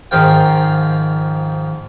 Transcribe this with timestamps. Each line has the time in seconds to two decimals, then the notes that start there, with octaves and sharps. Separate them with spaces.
0.11 G#2 D#3 F3 F5 G5